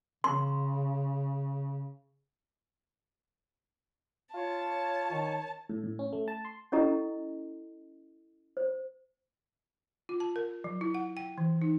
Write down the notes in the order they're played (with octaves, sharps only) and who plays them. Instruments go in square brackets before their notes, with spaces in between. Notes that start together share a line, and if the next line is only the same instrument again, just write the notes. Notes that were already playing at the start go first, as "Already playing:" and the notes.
[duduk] C#3 [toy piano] C6
[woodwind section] F4 C#5 [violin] A5
[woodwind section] D#3 C#5
[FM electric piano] A2
A2
C#4
A3
A5
C6
[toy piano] C#4 E4 G4 A4 D#5 A#5
C5
[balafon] F4
A5
A#4
F#3
E4
F#5
G5
E3
D#4